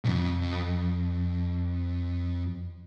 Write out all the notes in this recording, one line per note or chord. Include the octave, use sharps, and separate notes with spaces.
B1 F2